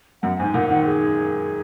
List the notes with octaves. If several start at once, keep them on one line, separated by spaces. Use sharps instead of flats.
F#2 F#5
G#2 G#5
A#2 F#5
D#3 F#5
G#4